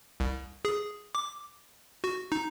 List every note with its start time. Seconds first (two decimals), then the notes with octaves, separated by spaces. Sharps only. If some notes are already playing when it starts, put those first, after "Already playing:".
0.20 C2
0.65 G#4
1.15 D6
2.04 F#4
2.32 D#4